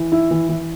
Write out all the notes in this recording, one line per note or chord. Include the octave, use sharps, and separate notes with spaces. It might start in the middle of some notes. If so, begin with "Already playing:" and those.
Already playing: E3
E4
E3
E3